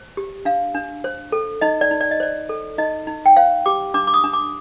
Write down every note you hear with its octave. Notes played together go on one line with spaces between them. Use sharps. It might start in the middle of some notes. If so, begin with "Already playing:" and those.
Already playing: C5
G4
D4 F5
D4
C5
A4
D#4 D#5
D5
D#4
D5
D#5
C5 D5
A4
D#4 D#5
D#4
G5
C5 F5
G4 D6
D4 D6
D6
D#6
D4
D6